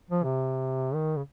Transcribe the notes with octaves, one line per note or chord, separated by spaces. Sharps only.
F3
C3
D#3
C#3